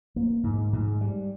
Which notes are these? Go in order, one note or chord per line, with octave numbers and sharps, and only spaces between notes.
A#3
G#2
G#2
G3